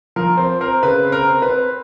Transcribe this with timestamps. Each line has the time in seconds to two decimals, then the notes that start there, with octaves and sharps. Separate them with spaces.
0.16 F3 A#4
0.37 C4
0.61 C4 A#4
0.83 C#3 B4
1.05 C4
1.12 A#4
1.27 C4
1.42 B4
1.50 C4